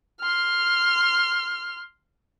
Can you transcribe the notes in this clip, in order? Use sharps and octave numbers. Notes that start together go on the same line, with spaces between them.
C6 F6